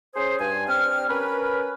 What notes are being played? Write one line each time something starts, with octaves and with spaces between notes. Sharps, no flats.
C#4 G#4 C5
G2 G#5
C4 D4 G4 F6
C#4 A#4 B4